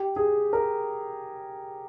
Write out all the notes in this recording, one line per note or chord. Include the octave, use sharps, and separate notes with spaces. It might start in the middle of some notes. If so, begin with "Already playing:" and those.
Already playing: G4
G#4
A#4